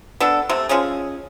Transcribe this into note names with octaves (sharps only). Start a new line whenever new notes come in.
B3 D4 A4
C3 A3
F3 G#3 C#4 G#4